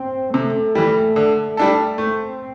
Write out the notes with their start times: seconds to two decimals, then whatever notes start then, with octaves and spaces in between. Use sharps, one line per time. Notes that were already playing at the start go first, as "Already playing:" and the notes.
Already playing: C4
0.34 C3 A3
0.75 E3 G3
1.16 D3
1.57 G3 D4 A4
1.98 A3 C4